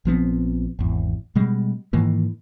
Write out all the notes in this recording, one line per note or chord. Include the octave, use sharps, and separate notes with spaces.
A#1 F3 B3 C4
G#1 E2
B2 G3 G#3
G#2 D#3 E3 A#3